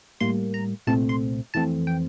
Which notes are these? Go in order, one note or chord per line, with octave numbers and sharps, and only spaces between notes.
A2 G3 A#3 C6
A#5
C2 A#2 A3 C4 A5
C6
F2 E3 A3 C4 A5
G5